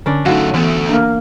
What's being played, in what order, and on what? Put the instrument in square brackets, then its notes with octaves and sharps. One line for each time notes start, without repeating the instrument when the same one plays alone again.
[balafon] D3 [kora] C#4 D4 D5
[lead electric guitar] F#2 A3 [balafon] D#4 F5 [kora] F#4
[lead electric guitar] D2 A3 [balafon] E3 B3
[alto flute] A#3 [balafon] D4